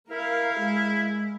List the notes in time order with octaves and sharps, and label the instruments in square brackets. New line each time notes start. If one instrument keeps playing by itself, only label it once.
[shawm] E4 [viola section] A#4 F5
[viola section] G#3